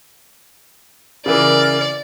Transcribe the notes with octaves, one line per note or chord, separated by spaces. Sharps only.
C#3 E3 A#4 D5